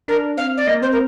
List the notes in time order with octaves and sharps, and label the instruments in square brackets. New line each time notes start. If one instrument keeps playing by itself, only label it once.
[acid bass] D4 [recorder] A#4
[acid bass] C4 [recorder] F5
[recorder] D5
[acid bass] A#3 [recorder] D#5
[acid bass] C4 [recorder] C5
[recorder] A#4